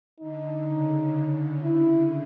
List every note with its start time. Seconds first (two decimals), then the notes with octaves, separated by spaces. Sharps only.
0.20 D3 D#4
0.68 C#3
1.63 E4